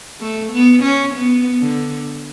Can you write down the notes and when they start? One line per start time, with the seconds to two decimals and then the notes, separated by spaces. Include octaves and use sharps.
0.20 A3
0.52 B3
0.83 C#4
1.15 B3
1.61 D3